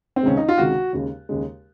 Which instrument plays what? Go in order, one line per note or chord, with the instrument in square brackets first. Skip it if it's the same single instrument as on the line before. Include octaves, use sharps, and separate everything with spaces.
[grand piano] C4
C#2 C3 D#3 G#3 C#4
D#4
F4
C#2 C3 D#3 G#3 F#4
D#2 C#3 G#3
D#2 C#3 G#3